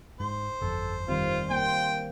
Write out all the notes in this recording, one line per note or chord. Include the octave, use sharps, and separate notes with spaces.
G#2 C5
G1 F2 A4
D#3 G3 C4 F4
A#3 G5